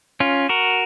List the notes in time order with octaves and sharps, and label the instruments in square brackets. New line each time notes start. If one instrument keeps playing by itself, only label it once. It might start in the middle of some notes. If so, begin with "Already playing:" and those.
[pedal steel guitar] C#4 F4
F#4 A#4